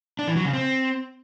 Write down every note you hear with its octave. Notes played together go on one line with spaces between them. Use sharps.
D4
E3
F#3
C#3
C4